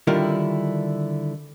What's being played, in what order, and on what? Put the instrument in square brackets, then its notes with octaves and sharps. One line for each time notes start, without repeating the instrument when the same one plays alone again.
[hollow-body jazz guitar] D3 D#3 G3 E4 F4 A#4